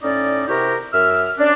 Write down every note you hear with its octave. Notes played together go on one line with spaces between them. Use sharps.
A2 C#4 D#4 D5
C3 E4 F#4 G4 A#4
F#2 E5 E6 F6
C#4 D4